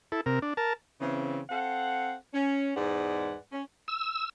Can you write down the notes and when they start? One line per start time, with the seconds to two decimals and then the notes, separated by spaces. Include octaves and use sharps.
0.12 E4 A4
0.26 C3 A#4
0.42 D4
0.57 A#4 A5
1.00 C#3 E3 C4
1.50 C4 A4 F5 F#5
2.33 C#4
2.75 E2 G#2 G#3 B4 D5 F#5
3.52 C#4
3.88 E6